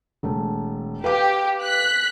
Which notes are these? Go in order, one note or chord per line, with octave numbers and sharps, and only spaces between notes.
E1 A3
G4 B4 F5 D6
F#6 B6